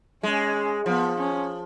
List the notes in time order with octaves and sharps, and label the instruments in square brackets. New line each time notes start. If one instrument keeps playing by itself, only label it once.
[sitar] G#3 [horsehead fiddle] C#4
[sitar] F3 [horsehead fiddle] B3
[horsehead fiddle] C#4